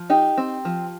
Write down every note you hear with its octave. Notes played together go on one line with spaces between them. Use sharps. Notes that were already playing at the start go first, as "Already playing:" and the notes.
Already playing: F3
D#4 G4
C4
F3